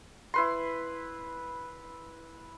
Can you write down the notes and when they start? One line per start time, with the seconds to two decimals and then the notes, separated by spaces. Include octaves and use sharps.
0.34 E4 B4 C6